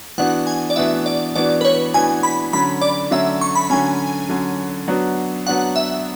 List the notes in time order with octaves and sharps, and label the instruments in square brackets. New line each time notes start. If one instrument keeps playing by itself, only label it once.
[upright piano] E3 B3 D4 F#4 [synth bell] F#5
[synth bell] G#5
D5
[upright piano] E3 B3 D4 F#4 [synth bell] E5
[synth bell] D5
[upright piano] E3 B3 D4 F#4 [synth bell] D5
[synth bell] B4
C#5
[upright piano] E3 B3 D4 F#4 [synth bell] G#5
[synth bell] B5
[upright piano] D3 F#3 C#4 [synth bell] B5
[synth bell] D5
[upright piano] D3 F#3 C#4 [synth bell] E5
[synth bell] C#6
B5
[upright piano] D3 F#3 C#4 [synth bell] G#5
[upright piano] D3 F#3 C#4
F#3 B3 D4 F#4
[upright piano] F#3 B3 D4 F#4 [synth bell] F#5
[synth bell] E5